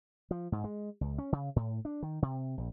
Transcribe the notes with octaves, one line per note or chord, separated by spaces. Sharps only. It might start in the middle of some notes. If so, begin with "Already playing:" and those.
F3
G#2
G#3
C#2
C#4
C#3
A2
D4
D#3
C3
A#1